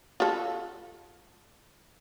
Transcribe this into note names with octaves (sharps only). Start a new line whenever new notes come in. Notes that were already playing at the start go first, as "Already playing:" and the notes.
F4 A4